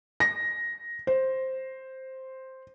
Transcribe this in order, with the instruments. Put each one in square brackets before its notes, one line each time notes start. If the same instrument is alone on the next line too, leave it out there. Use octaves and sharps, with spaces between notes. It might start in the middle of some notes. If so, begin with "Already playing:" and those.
[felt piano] A#6
C5